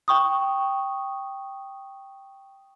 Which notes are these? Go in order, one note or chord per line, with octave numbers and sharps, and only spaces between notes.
G5 C#6 D#6